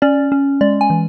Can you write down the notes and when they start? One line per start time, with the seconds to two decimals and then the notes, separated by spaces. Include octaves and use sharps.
0.02 C#4 D5
0.32 C#4
0.61 G#3 D5
0.81 G#5
0.90 E3